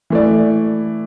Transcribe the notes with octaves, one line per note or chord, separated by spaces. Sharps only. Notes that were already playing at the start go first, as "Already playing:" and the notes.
E3 A3 E4 D5